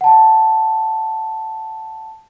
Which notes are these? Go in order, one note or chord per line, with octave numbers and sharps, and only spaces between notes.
F#5 A5